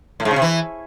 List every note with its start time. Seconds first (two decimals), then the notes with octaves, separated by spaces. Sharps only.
0.20 A2
0.25 G#2
0.31 C#3
0.36 C3
0.42 E3